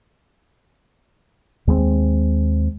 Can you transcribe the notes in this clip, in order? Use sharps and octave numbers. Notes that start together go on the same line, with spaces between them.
D#2 G#3 A#3 C4